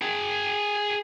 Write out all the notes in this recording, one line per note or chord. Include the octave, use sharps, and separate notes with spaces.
G#4 G5